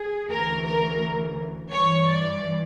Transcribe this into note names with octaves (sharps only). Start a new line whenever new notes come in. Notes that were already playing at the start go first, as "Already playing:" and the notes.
Already playing: G#4
D2 C#3 E3 A#4
A#4
G2 E3 C#5
D5